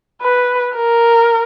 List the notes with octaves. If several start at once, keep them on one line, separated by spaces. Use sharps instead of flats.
B4
A#4